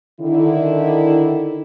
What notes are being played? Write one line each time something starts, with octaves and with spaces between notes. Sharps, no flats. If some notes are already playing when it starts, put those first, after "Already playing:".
D3 D#3 E4